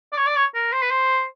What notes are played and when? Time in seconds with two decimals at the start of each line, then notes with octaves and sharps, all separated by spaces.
0.12 D5
0.17 C#5
0.26 D5
0.36 C#5
0.54 A#4
0.72 C5
0.82 B4
0.91 C5